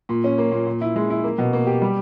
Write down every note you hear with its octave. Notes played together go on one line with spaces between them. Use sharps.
A#2
C#4
A#3
A#2
A#2
E4
G#3
E4
A#3
B2
A#3
G4
G3